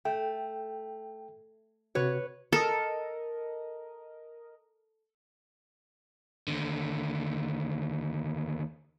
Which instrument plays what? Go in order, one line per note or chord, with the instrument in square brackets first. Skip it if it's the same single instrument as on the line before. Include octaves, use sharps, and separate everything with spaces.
[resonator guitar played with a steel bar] A3 [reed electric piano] G5
[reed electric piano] C3 F#4 [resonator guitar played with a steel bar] B4 C#5
[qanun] A4 [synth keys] A#4 D#5
[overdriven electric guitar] D#2 D3